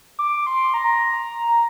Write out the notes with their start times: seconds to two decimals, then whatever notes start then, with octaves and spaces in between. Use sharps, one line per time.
0.19 D6
0.47 C6
0.74 A#5